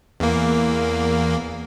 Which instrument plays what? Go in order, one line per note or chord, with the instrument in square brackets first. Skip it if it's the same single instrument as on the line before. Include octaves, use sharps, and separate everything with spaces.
[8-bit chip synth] E2 A#3